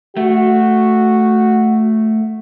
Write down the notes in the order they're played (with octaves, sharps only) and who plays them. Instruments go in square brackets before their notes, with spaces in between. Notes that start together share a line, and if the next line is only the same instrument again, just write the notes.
[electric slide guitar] A3 [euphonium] F#4